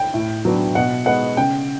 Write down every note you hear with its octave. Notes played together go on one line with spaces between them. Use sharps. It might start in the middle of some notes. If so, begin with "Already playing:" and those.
Already playing: G5
A2
F#3 B3 D4
B2 F#5
G#3 B3 F#5
C#3 G5